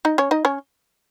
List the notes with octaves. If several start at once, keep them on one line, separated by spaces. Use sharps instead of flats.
D#4 D#5
C#4 C#5
D#4 D#5
C#4 C#5